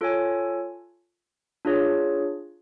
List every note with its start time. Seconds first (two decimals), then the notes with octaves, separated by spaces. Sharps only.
0.01 F4 A4 C#5 G#5
1.65 D4 F4 G#4 C#5